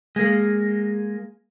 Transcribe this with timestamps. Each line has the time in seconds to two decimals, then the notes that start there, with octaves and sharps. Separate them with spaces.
0.16 G#3 A#3